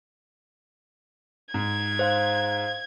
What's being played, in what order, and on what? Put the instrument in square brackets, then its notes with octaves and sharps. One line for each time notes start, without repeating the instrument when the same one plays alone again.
[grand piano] G#2 [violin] G#6
[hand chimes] C5 F5